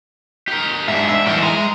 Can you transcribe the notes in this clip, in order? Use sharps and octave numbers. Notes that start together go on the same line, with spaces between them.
G4 A#4
G#2 D4 E5
E5
E3 A#3 E5 G5
G#3 A#5